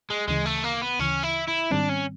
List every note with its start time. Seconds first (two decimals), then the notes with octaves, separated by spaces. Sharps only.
0.10 G#3
0.28 D2 C#3 E3 G#3
0.46 A3
0.64 A#3
0.82 B3
0.99 D2 C#3 E3 C#4
1.23 E4
1.48 E4
1.71 G#2 D#3 G3 C4 D4
1.89 C#4